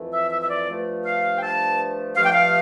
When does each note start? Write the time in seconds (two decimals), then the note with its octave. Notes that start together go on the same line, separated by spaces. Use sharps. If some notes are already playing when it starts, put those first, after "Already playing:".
Already playing: F2 E3 A3
0.12 E5
0.31 E5
0.42 E5
0.49 D5
0.68 G2 F3 A3
1.05 F5
1.37 G5
1.42 A5
2.16 G2 F3 A3 F5
2.24 G5
2.33 F5